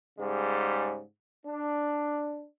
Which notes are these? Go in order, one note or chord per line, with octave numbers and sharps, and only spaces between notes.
G#2 C#3 G3
D4